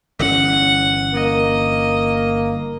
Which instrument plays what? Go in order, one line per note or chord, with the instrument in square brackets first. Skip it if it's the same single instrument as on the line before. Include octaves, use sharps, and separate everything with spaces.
[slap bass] G1 E3 C#4 [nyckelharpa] F#5
[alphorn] A#3 [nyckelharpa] D#5